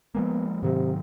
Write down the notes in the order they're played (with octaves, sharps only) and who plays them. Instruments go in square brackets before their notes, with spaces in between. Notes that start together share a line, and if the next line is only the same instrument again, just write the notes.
[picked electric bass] F3 G#3 A#3 [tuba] B3
[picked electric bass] G#2 D#3 F#3 [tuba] C3